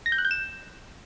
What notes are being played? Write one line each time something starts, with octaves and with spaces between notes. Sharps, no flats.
A#6
G6
F#6
G6
E7